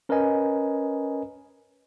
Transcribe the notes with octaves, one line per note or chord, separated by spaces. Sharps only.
C#4 A#4 B4 C#5 D#5 G#5